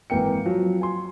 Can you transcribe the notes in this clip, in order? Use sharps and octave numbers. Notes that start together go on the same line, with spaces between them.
G#1 E3 A#3 G5 C#7
F3 F#3
G#5 C6